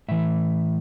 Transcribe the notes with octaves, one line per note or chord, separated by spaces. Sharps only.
A2 E3 E5